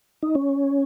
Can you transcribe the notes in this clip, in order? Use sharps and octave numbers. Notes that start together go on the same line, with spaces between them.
D#4
C#4